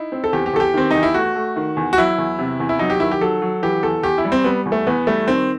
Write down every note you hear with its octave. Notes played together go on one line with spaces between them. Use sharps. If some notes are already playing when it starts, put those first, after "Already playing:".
Already playing: D#4 E4
C4
A4
E2 G4
G4
E2 A4
G4
D#3 C4
E2 D#4
E4
A3 F#4
A3
D#3
E2
F#4
F#3 E4
E2
C3
E2
E4
F#3 D#4
G4
D#3 E4
G4
F#3 A4
F#3
E3 G4
E2 A4
E2 G4
E4
G3
C4
G3 B3
E2
A3
E2 B3
G3 A3
D#3 C4